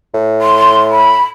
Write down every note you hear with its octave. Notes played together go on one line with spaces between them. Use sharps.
A2
C6
B5